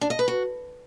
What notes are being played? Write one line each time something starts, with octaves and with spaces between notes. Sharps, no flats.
D4
D#5
B4
F#4